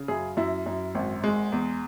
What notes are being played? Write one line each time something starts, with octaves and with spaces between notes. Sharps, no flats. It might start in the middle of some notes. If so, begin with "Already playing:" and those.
Already playing: C#3
F#2 G#4
F#2 E4
F#2
G#1
G#3
E2